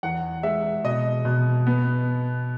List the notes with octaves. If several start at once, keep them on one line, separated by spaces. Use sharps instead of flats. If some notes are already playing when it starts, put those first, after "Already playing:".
E2 F#5
G#3 E5
B2 D#5
B2
B3